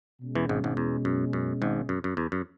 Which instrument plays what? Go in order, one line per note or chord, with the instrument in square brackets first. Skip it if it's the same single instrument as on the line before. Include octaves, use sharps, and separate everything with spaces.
[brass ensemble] B2 G#3 C#4
[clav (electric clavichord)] E2 E3
G#1 G#2
G#1 G#2
E2
F#2
F#2
G#1 G#2
F#2
F#2
E2
F#2